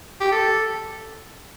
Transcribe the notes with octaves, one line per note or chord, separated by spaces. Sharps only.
G4
A4